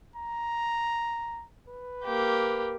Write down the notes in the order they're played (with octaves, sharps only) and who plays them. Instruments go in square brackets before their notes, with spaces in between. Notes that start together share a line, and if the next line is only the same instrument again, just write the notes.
[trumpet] A#5
B4
[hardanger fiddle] A#3 G4